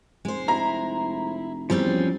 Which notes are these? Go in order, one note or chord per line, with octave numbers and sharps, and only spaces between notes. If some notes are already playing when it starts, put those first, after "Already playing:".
F1 G#3 C5
E4 A#5
E2 F3 G3 C4 C#4 G6